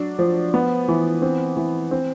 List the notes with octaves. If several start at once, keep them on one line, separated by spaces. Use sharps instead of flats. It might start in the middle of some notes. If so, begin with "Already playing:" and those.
Already playing: F#3 D4
F3
B3
E3
C4
E3
C4